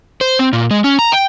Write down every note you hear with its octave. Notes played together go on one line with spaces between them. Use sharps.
C5
C4
A#2
G#3
C#4
A#5
G5